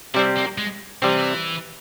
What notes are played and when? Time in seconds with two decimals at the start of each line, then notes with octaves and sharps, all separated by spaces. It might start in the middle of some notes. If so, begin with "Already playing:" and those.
0.15 C3 G3 C4 E4
0.37 A#3
0.58 G#3
1.02 C3 E3 G3 C4